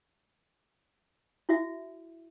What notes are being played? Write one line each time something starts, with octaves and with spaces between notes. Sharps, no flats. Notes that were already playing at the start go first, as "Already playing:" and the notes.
E4 F#4 E5